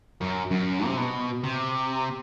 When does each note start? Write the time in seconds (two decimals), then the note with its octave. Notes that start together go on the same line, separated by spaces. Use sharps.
0.21 F#2
0.51 F#2
0.86 C3
0.98 B2
1.44 C3